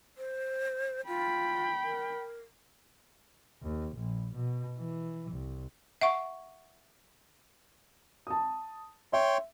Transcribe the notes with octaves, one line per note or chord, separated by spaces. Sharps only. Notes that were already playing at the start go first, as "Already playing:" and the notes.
C5
F4 G5 B5
A#4
D#2
A#1
B2
E3
C2
E5 F#5 C#6
A5 D#6
C#5 E5 G5 C6